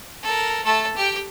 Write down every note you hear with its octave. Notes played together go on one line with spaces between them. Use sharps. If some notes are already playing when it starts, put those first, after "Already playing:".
A4 A#4
A3 A4
G4 G5